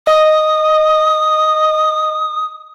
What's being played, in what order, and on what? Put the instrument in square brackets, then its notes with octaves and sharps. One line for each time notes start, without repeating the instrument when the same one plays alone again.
[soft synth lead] D#5 [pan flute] D#6